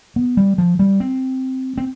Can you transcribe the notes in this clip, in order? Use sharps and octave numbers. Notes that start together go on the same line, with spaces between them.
B3
G3
F3
G3
C4
C4